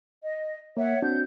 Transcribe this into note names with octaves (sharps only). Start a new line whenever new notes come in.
D#5
A#3 C#5 E5 F#5
C4 D4 F#4 G6